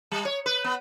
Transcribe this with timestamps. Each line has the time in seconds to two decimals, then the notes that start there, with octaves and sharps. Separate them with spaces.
0.12 G3
0.25 C#5
0.46 B4
0.64 B3